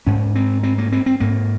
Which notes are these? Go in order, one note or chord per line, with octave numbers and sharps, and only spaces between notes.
G#2 C#4
C4
C4
A#3
C4
C4
G#2 A#3